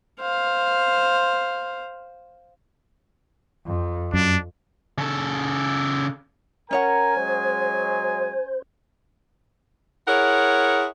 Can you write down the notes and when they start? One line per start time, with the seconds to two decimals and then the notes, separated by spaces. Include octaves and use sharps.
0.20 C5 F5
3.66 F2
4.14 F#2 D4
4.98 C#3 A4
6.71 C#4 A#4 C#5 F#5 G#5 A#5
7.17 F#3 G#3 C5
10.07 E4 G#4 A#4 C#5 F#5